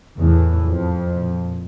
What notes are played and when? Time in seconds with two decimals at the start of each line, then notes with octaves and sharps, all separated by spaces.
0.17 E2 A2 E3
0.64 F2 F3
1.12 A#2